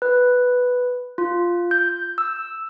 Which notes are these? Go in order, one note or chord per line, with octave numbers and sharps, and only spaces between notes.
B4
F4
G6
E6